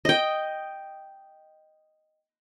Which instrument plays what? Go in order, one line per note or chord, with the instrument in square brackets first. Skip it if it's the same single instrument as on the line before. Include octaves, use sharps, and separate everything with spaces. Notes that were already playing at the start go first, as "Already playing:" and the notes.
[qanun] D#5 G5